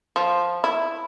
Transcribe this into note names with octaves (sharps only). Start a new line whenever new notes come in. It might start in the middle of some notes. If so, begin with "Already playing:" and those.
F3
E4